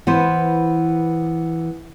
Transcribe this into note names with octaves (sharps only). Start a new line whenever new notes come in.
E3 B3 B4 C5